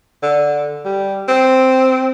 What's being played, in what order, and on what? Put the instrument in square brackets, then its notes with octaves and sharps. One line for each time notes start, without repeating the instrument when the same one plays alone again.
[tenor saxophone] D3
G3
C4